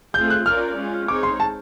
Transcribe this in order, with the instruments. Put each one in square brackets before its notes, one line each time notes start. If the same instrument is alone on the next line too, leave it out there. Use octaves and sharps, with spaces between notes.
[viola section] A3 C4 F4 G#4 [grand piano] G6
[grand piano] F#6
[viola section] C#4 F4 A#4 D5 [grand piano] F6
[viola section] G#3 C#4 F4
[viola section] G#3 C4 D#4 G#4 C#5 [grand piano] D6
[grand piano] C6
A5